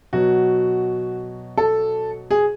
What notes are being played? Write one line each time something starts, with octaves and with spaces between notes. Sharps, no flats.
B2 F#3 F#4
A4
G#4